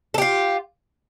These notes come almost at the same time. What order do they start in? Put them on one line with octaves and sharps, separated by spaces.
A4 G4 F4